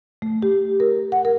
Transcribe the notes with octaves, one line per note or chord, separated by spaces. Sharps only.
A3
G4
A#4
F#5
A#4